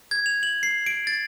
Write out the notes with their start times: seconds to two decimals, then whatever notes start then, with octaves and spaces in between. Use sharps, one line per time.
0.11 G#6
0.26 F7
0.43 F#7
0.63 C7
0.86 D7
1.07 A6